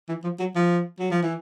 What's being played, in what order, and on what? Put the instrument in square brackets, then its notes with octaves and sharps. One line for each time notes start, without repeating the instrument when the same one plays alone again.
[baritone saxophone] E3
F3
F#3
F3
F#3
F3
E3